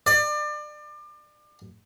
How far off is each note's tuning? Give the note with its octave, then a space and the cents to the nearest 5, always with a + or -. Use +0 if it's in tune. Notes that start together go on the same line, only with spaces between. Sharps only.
D5 +30